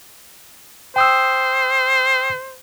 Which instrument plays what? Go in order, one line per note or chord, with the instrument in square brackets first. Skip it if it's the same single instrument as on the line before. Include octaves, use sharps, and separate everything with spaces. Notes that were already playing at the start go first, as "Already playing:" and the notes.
[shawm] C5 [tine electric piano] G5 D#6 E6